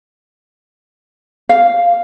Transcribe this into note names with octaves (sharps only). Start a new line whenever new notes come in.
F5